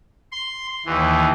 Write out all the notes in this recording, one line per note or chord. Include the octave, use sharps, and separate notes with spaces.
C6
D#2 E3